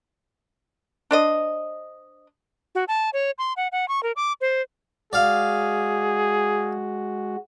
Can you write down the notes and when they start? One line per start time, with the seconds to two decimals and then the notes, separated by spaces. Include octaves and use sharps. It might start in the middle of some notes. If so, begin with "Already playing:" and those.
1.11 D4 C5 D#5
2.75 F#4
2.88 A5
3.13 C#5
3.38 C6
3.57 F#5
3.72 F#5
3.88 C#6
4.03 A#4
4.16 D6
4.41 C5
5.13 G#3 F#4 G#4 D5 F5